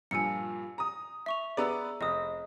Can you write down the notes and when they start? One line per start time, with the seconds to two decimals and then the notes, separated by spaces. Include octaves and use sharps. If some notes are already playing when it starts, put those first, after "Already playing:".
0.11 G2 A#2 F3 G#5 E6 C#7
0.78 A#5 D#6
1.26 E5 C#6 F7
1.57 B3 G#4 B4 D5 A#5 E6
2.01 F1 D#5 D#6